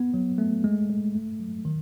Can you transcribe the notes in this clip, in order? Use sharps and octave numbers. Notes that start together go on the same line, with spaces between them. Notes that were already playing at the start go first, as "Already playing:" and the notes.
Already playing: B3
F#3
A3
G#3
G#3
A3
F#3
D#3